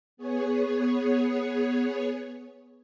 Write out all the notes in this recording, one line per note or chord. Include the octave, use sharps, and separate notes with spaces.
B3 G#4 C#5